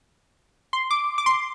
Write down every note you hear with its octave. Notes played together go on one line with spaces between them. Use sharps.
C6
D6
D6
C6